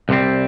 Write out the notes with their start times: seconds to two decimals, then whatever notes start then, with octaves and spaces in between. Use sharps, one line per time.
0.09 C2 C3 G3 C4